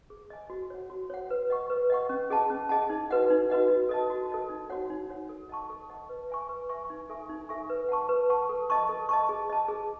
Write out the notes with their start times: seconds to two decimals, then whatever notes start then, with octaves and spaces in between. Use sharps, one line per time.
0.10 G#4
0.30 D#5 G#5
0.50 F#4
0.70 C#5 F#5
0.90 F#4
1.10 C#5 F#5
1.30 B4
1.50 D#5 F#5 C#6
1.70 B4
1.90 D#5 F#5 C#6
2.09 C#4
2.30 G#4 D#5 F#5 A5
2.50 C#4
2.69 G#4 D#5 F#5 A5
2.90 D#4
3.10 F#4 B4 D#5 F#5
3.30 D#4
3.50 F#4 B4 D#5 F#5
3.70 F#4
3.89 A4 D#5 A5
4.10 F#4
4.29 A4 D#5 A5
4.50 D#4
4.70 F#4 C#5 F#5
4.90 D#4
5.09 F#4 C#5 F#5
5.29 A4
5.49 D#5 F#5 A5 C#6
5.70 A4
5.90 D#5 F#5 A5 C#6
6.09 B4
6.30 E5 G#5 C#6
6.49 B4
6.69 E5 G#5 C#6
6.90 D#4
7.10 A4 E5 G#5 C#6
7.30 D#4
7.49 A4 E5 G#5 C#6
7.70 B4
7.89 F#5 A5 C#6
8.09 B4
8.30 F#5 A5 C#6
8.49 A4
8.70 D#5 A5 C#6
8.89 A4
9.09 D#5 A5 C#6
9.29 G#4
9.50 D#5 A5
9.68 G#4